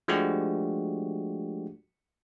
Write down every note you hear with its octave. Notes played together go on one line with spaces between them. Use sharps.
F3 G#3 A3 D4 F#4 G4